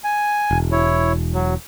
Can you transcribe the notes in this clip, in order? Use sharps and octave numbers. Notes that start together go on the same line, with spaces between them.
G#5
E1
E4 C#5
F#3